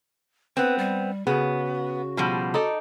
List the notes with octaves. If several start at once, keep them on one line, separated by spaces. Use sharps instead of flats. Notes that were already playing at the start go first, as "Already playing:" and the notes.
B3 C4 B4
G3
C#3 B3 F#4
B2 F3 G3
D#4 A4 D5